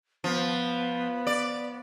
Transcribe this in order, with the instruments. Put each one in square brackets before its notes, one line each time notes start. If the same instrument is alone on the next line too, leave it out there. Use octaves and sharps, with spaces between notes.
[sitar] F3 [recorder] B3
[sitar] D5